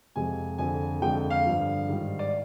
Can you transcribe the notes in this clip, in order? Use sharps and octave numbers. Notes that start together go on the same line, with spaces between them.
F2 C3 F3 G#3 G#5
F2 D3 G#3 G#5
F2 D3 G#3 G5
F5
G2 D3 F3
G#2 D#3 G3
D5